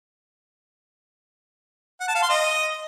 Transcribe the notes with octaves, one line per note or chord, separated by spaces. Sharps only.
F#5
A5
F5
C6
D#5